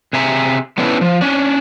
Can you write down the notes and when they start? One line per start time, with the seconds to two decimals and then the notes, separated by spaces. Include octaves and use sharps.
0.13 C3 G#4 E5 A#5
0.78 A3 B3 C#4 D4 E4
1.01 F3
1.21 C#4 D4